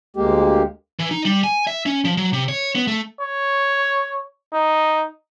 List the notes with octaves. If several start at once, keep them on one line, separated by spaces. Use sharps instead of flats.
D2 G#3 A#3 G4
E3
D#4
G3
G#5
E5
C#4
F3
F#3
C3
C#5
B3
A3
C#5
D#4